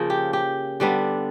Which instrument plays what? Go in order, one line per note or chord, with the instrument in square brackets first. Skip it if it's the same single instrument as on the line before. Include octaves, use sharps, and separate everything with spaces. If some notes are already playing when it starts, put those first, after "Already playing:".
Already playing: [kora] C#3 F3 A#3
G4
G4
D3 G3 B3 D4